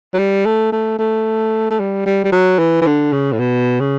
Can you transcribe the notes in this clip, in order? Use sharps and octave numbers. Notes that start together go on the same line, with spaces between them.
F#3
G3
A3
A3
A3
A3
G3
G3
G3
F#3
E3
E3
D3
C#3
A2
B2
C#3